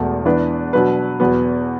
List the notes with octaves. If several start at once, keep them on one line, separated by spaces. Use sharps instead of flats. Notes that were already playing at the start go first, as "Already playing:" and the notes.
Already playing: E1 E2 B2 A3
E2 E3 B3 D4 B4
B2 F#3 D4 B4
E2 B2 F#3 B3